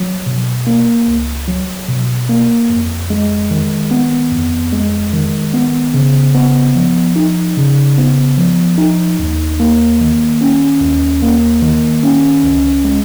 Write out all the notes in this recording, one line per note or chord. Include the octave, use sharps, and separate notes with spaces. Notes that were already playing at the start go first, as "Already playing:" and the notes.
Already playing: F#3
B2
A#3
C#2
F#3
B2
A#3
F2
G#3
D#3
B3
F2
G#3
D#3
B3
C#3
B3
F3
D#4
C#3
B3
F3
D#4
D#2
A#3
D#3
C#4
D#2
A#3
D#3
C#4
C#2
G#3